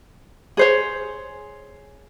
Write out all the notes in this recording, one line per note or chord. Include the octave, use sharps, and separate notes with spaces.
G#4 C5 C#5